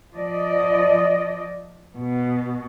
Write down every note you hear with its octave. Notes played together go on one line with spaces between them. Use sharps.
F3 D5 D#5
B2